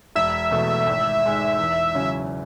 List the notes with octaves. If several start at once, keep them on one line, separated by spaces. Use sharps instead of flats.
E1 E5
E2 B2 A3
G#1
G#2 G#3
E2
C#3 F#3 C#4 E4